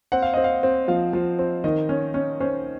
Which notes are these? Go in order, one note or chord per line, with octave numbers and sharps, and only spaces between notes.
C4 F#5
F5
C4 D#5
F5
C4
F3 F5
F3
C4
D#3 D#5
C#4
C#4
C#4 C5